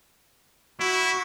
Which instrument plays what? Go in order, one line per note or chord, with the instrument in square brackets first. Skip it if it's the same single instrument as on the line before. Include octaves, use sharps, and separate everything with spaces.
[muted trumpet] E4 [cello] F#4